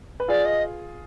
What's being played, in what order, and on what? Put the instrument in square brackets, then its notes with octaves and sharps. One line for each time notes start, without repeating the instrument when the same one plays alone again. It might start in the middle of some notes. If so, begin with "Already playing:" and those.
[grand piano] B4
[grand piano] F4 G#4 [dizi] D5
[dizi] D#5